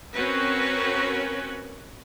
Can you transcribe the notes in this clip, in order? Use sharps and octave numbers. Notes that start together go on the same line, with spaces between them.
C4 C#4 F#4 A#4 B4 C#5